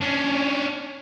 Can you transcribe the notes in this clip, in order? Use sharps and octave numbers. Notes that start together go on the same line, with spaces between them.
C#4 D4